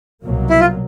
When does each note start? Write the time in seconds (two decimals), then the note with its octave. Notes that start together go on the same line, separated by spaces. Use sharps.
0.24 C2 B2 F#3 A#3
0.50 E4
0.60 F4